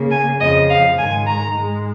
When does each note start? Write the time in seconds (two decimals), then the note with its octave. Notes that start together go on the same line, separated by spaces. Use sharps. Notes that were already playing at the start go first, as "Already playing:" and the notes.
Already playing: C#3 A#3
0.10 G#5
0.39 F2 C#3 F3 D#5
0.69 F5
0.97 G#2 D#3 G#3 G#5
1.27 A#5
1.56 G#2 G#3